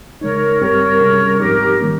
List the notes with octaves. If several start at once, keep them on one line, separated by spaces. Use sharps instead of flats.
C#3 G#3 D#4 A#4 C#5
G2 G3 C4 G4 A#4 C#5
C3 G3 C#4 G#4
G#2 F3 C4 D#4 G4 A#4
D#3 G3 A#3 C#4